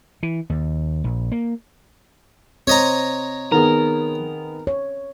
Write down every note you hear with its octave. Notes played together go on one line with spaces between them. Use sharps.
E3
D#2
A#1
A#3
C4 C5 C#5 D#5 A#5
D#3 B3 G#4 A#4
C#5